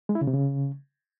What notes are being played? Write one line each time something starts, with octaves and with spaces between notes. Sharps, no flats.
G#3
E4
C#3
C3
C#3